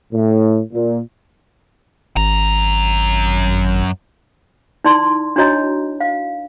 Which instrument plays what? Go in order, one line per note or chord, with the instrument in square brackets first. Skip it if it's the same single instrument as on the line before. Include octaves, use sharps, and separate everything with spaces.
[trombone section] A2
A#2
[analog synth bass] G#1 [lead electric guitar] F#2 A#5
[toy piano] D#4 E4 D5 C6
D4 E4 F#4 C#5 D#5 A#5
F5